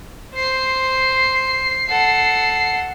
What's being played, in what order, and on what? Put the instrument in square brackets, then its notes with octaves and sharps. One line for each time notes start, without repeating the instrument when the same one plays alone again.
[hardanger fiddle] C5 [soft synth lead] C7
[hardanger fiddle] A4 F#5